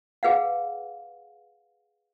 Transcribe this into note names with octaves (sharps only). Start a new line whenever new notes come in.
G#4 B4 F5 F#5